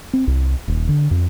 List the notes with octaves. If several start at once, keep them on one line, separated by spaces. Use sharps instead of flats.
C4
C2
D#1
D3
F2